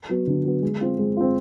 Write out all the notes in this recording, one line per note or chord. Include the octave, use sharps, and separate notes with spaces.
F#3 B3
D3
F#3 B3
G#3
C4 F4
G#3
C4 F4